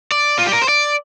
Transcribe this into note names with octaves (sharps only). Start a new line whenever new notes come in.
D5
F4
G4
A#4
C5
D5